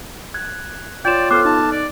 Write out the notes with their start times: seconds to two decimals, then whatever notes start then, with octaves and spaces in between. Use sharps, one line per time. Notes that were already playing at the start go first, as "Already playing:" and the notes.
0.34 F#6 G#6
1.05 F4 C#5 D5 G5 G6 E7
1.31 B3 A4 C5 D6 F6 F#6
1.45 D#4 A5
1.72 D5